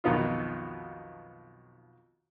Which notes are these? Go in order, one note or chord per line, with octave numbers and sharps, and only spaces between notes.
B1 F2 D#3 B3 D#4 F4